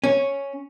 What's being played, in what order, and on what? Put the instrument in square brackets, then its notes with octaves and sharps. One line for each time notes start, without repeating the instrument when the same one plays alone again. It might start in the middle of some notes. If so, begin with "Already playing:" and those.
[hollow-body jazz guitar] C#4